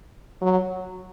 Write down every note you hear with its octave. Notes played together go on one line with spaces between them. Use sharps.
F#3